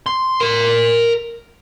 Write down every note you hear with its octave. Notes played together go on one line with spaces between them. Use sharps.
C6
A#4 C6